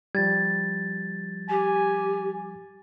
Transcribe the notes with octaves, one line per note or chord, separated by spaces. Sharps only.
F3 G3 G#6 A6
G4 G#5